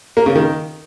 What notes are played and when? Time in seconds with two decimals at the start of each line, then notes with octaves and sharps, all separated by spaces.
0.17 A#3
0.26 C#3
0.35 D#3